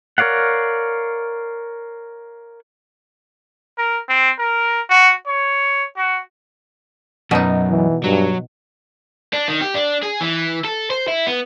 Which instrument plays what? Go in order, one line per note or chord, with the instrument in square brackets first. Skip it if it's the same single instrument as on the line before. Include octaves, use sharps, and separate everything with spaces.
[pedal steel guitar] A#4 C#5 D5 F5 F#5
[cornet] A#4
C4
A#4
F#4
C#5
F#4
[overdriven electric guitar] F#2 [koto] B2 D#4
[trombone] E3
[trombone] G2 [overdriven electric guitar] F#3
[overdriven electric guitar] D4
D#3
G4
D4
G#4
E3
A4
C5
E4
B3